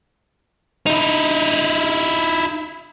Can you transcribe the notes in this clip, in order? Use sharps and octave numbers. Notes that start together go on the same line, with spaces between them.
D#4 E4